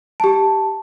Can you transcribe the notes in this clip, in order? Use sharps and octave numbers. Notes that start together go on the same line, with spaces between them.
G4 A5